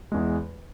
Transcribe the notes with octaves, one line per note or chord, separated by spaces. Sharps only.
E2 E3 G#3